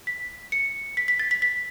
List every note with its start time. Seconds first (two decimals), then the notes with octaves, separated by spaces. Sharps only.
0.07 B6
0.52 C#7
0.97 B6
1.08 B6
1.19 A6
1.31 B6
1.42 B6